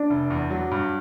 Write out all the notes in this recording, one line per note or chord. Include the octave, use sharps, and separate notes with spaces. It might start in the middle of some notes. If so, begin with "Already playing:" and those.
Already playing: D4
F1
E2
F#3
G2